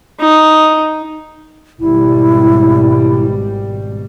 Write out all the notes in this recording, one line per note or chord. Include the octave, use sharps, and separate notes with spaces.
D#4
G#1 B2 G3 E4